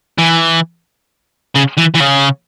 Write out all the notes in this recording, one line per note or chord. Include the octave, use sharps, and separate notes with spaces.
E3
C#3
E3
E3
C#3